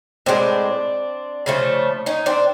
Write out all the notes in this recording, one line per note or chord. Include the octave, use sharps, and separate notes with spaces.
A2 E3 G#3 C4 D4
C#3 F3 A3
C#4 D#4
C4 D4